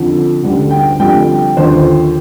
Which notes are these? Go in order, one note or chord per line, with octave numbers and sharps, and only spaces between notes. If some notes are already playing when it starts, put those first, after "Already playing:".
Already playing: F2 D3 F3
D2 D3 G3
G5
F2 D3 G3 G5
D#2 D3 F3 C5